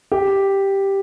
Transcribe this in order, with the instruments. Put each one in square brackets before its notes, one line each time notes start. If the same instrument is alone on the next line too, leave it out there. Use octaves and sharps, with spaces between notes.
[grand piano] G4